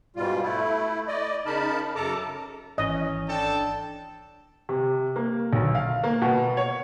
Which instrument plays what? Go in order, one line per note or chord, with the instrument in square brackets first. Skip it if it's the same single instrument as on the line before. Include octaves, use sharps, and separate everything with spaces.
[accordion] G#2 B2 G3 F4
A3 E4
D5 D#5
C#3 D#4 A#4 A5 B5
F#2 C#3 A4 A5 A#5 D6
[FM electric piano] G#1 E3 [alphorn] C#4 [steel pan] D#5
[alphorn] D4 [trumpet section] A4 G5 A5
[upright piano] C3
A#3
B1
F5
A#3
B2
C#5